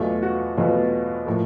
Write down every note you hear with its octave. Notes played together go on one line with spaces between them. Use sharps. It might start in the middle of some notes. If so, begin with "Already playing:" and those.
Already playing: E2 B2 F#3 A3 F4
F#4
E2 B2 F#3 A3 F4
A2 F3 A#3